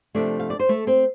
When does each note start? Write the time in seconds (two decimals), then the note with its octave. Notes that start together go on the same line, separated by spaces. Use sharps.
0.15 C3 F3 A3 D4 D5
0.40 F5
0.50 D5
0.59 C5
0.69 A3 A4
0.87 C4 C5